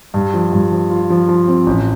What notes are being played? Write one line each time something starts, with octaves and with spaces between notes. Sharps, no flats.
G2
F3
G2
F3
F4
F3
F3
C4
A1